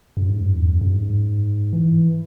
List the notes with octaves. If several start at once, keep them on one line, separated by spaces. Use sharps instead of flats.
F#2
G#2
F#2
E2
F#2
F#2
G#2
E3